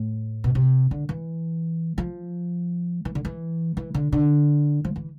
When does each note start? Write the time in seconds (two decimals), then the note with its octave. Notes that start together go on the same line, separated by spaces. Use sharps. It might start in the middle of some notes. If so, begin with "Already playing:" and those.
Already playing: A2
0.44 B2
0.55 C3
0.91 D3
1.09 E3
1.98 F3
3.05 E3
3.15 D3
3.25 E3
3.77 E3
3.94 D3
4.12 D3
4.85 F3
4.96 E3